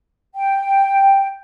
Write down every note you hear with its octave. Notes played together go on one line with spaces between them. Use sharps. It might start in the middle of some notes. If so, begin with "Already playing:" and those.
G5